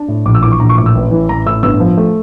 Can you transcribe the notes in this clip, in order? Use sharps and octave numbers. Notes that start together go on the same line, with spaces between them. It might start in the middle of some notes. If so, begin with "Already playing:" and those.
Already playing: D4
A2
A#1 D6
E6
E3 D6
C#6
A#1 A#5
C#6
A2 D6
E6
A1
E3
A1 A#5
A2 E6
G1 E6
F3
A3